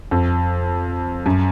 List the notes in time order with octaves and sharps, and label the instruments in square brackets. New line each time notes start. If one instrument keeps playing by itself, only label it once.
[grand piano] F2
F#2